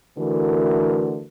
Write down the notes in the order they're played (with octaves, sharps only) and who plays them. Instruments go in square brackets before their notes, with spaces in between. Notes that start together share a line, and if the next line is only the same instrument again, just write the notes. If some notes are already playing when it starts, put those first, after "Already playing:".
[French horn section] D3 E3 A3 F#4 A#4 B4